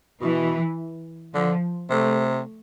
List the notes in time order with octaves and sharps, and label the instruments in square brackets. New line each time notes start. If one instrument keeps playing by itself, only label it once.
[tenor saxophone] B2 [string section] E3
[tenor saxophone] D3 [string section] F3
[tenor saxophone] C3 [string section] A3